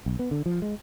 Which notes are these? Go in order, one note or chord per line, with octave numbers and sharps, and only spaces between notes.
B1
B3
D3
F3
G#3